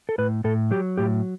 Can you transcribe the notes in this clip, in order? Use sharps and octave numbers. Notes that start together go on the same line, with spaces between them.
A4
A2 B4
A2 A4
F#3 G4
A2 G4